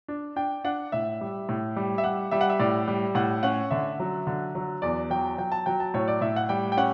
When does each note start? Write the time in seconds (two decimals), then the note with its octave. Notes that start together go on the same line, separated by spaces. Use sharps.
0.08 D4
0.36 D4 G5
0.64 D4 F#5
0.92 A2 E5
1.21 G3
1.49 A2
1.76 G3
1.98 E5
2.04 G3 F#5
2.31 G3 E5
2.41 F#5
2.50 E5
2.60 A2 D5
2.88 G3
3.15 A2 F#5
3.43 C#4 F#5
3.71 D3 E5
4.00 F#3
4.27 D3
4.55 F#3
4.82 E2 D5
5.10 F#3 G5
5.38 F#3 G5
5.52 A5
5.66 F#3 G5
5.80 A5
5.94 A2 C#5
6.08 D5
6.21 A2 E5
6.36 F#5
6.49 G3 G5
6.72 G5
6.77 C#4 F#5